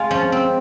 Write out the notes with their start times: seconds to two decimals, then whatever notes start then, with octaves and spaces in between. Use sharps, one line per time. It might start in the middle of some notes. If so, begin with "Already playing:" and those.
Already playing: G#3 F4
0.11 F3 C#4
0.32 C4